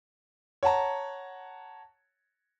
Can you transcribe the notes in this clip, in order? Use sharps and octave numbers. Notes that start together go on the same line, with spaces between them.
C#5 F#5 A5 A#5